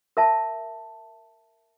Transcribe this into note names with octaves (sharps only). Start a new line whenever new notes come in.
A#4 E5 A5